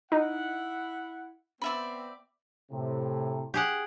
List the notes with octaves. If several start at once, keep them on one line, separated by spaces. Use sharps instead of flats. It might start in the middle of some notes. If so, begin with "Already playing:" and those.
D#4 E4 F#5
B3 C4 D5 E5 B5
A2 C3
G4 G#4 F#5